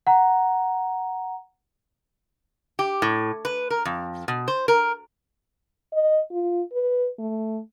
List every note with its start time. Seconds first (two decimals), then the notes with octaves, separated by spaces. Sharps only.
0.07 F#5 A#5
2.79 G4
3.02 A2
3.45 B4
3.70 A#4
3.85 F2
4.28 B2
4.48 C5
4.68 A#4
5.93 D#5
6.32 F4
6.72 B4
7.19 A3